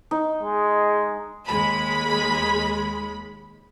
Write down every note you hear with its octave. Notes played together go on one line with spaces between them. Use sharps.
D#4
G#3
D#2 G#3 B5